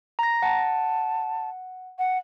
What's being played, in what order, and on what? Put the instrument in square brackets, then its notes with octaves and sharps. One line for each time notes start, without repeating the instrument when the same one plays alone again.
[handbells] A#5 A#6
[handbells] F#5 [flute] A5
[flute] F#5